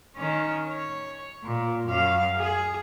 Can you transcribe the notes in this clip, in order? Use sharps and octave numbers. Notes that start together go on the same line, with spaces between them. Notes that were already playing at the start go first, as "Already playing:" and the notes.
D#3 C#4
C#5
A#2
F#2 F5
G#4